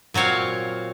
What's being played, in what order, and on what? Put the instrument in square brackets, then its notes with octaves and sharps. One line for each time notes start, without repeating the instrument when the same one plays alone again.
[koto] A#2 F#3 C4 C#5 F5